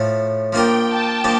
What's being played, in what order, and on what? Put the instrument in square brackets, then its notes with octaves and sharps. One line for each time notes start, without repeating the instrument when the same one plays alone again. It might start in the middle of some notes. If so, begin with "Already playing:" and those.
Already playing: [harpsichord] A2 F3 A3
[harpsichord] F3 A#3 D4 F4 A#4 [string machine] G5
[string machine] A5
[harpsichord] F3 A#3 D4